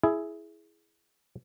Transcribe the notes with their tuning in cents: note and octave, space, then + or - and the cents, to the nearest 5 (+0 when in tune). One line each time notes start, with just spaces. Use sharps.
E4 +0 G#4 +10